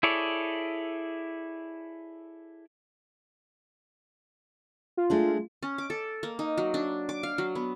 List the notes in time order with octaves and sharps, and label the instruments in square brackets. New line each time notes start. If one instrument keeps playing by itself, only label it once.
[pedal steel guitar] E4 G#4 A4 C#5 D5
[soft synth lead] F4
[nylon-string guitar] G#3 A3 D4
[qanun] C#4
D6
A4
A#3
D#4
F#3
D4
D6
F5
F#3
B3